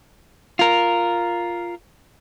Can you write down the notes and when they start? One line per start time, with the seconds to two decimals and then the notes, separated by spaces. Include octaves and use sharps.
0.59 F4 A#4